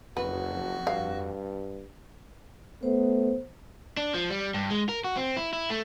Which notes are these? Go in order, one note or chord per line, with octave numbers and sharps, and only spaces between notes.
F#1 F2 F#4 B4
G2 F5
A3 B3 C5
D4
F3
G3
G2
G#3
A#4
F#4
C4
E4
E4
A3